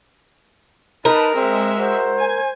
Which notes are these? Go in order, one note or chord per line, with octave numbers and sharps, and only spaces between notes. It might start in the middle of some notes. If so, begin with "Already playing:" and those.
D#4 A#4 B4 A5
G#3 C4 E5
F#4 C5
G#5